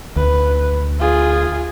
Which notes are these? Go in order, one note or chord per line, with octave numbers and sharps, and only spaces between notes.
D2 B4
F4 G#4